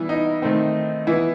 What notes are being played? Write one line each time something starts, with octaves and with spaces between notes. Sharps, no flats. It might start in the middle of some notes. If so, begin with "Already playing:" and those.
Already playing: E3 G3 B3 E4
D#4
D#3 A3 C4
E3 B3 E4